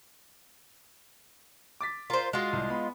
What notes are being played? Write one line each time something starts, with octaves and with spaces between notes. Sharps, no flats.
D6 A6 B6
F4 A#4 C5 F5
G#3 F4 F#4
C2
B3 B5